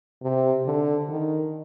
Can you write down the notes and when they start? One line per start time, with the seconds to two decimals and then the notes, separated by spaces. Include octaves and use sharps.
0.22 C3
0.65 D3
1.09 D#3